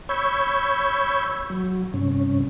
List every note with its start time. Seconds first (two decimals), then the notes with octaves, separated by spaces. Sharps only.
0.09 C#5 B5 C#6 E6 G6 G#6
1.50 F#3
1.94 G2 C3 C#4